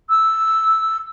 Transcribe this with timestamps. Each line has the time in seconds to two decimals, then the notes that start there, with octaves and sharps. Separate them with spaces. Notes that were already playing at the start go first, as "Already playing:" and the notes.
0.10 E6